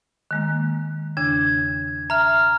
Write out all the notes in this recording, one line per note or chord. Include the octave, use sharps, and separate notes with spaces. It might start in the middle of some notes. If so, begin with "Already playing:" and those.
D#3 G#3 A#3
E2 C#3 D4 G#6
E5 A#5 F6